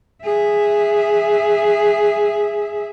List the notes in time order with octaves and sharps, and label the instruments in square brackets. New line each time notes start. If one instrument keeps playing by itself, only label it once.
[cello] G#4 E5